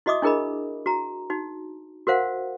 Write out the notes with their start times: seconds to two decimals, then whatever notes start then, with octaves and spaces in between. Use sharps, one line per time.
0.06 E4 F#4 D#5 E5 D6 D#6
0.22 D4 E4 G#4 A#4 D#5 B5
0.86 F#4 A#5
1.30 D#4 F#4
2.07 F#4 A#4 C5 F5 F#5